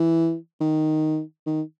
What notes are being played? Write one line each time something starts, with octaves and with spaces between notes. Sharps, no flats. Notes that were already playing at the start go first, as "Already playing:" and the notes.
Already playing: E3
D#3
D#3